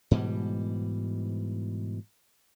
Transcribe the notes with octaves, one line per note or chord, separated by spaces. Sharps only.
G#2 B2 E3 G3